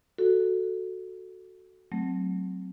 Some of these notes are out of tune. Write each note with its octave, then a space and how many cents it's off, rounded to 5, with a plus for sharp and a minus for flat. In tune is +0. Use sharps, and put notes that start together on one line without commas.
F#4 +0 A4 +0
F#3 +10 A3 +0 C4 +0